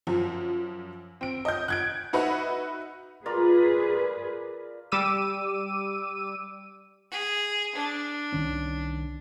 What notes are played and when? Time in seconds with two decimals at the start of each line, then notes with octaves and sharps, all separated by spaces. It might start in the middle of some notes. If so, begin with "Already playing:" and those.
0.07 F#2 F3
1.21 C4 D7
1.45 D#5 G6
1.68 F#6 G#6 D7
2.13 D#4 F#4 B4 E5 F#5
3.26 F4 G#4 A#4 B4 D5
4.92 G3 D6 E6 D#7
7.11 G#4
7.75 D4
8.33 C2 D#3 C#4